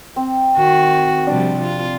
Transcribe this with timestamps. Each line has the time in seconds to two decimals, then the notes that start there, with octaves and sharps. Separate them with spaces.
0.16 C4
0.55 D#3 F#4
1.27 C3 F3 G3 D4
1.63 F4